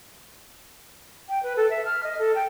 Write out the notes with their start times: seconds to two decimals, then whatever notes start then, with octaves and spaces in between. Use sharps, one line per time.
1.29 G5
1.43 B4
1.57 A4
1.70 E5
1.85 F6
2.03 D#5
2.19 A4
2.35 G5